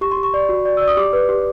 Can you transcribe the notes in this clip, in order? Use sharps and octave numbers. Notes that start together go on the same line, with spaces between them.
G4 C#6
C6
G4
C#6
D5
F#4
D5
D5 E6
D#6
G4 D6
B4
G4